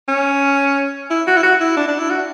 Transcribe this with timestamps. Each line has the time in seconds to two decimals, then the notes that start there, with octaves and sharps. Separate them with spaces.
0.08 C#4
1.10 E4
1.27 F#4
1.37 E4
1.43 F#4
1.61 E4
1.77 D4
1.88 D4
1.99 E4
2.10 F#4